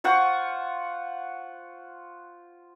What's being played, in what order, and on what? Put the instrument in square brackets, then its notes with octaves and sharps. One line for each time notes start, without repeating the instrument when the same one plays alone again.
[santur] F4 C5 F#5 C#6